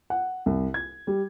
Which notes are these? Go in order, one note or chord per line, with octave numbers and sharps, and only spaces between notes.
F#5
C2
G#6
G3